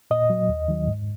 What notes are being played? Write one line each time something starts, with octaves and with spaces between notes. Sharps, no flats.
A#2 D#5
F#3
D#2
D#3 F#3
G#2